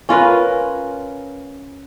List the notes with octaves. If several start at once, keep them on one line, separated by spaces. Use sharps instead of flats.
C#4 F4 A#4 B4